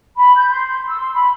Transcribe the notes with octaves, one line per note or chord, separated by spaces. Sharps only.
B5
G6
C6
E6
C6
B5